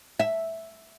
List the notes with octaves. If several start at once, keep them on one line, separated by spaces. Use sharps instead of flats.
E5